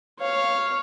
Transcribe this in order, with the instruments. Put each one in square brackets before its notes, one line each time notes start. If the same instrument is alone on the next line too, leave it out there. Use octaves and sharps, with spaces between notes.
[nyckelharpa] C#5 F5